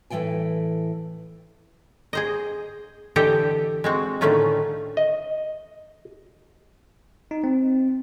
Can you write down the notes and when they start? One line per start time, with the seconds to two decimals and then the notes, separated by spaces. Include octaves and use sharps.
0.10 A2 E3 F3 G5 G#5
2.13 G#4 C5 D#5
3.16 D3 E3 G4 A4 D#5 E5
3.84 G#3 C4 F#4
4.21 A2 D3 D#3 A3 C#4 F4
4.97 D#5
7.31 D#4
7.44 C4